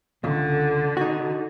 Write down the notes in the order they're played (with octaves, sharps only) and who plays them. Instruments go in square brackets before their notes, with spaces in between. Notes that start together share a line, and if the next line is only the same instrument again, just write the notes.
[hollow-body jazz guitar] C#2 [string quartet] D3
[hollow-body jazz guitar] D#4 F#4